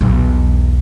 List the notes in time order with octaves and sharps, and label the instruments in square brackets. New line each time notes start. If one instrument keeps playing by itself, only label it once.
[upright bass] B1 E2